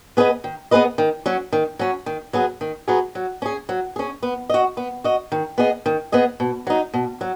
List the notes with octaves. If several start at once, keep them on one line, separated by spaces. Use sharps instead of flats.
B3 G#4 B4 D#5
D#3
B3 G#4 B4 D#5
D#3
F#3 C#4
D#3
F#3 C#4
D#3
F#3 B3 G#4
D#3
F#3 B3 G#4
F#3
C#4 G#4
F#3
C#4 G#4
B3
F#4 D#5
B3
F#4 D#5
D#3
B3 G#4 D#5
D#3
B3 G#4 D#5
B2
F#3 D#4
B2
F#3